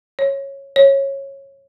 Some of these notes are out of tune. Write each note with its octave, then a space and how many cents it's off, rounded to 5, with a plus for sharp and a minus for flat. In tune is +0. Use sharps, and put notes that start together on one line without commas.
C#5 -10
C#5 -15